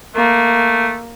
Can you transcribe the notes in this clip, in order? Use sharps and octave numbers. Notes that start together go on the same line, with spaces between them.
A3 A#3